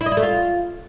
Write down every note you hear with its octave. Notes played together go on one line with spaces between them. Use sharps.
E4
D#5
E4
A3
F4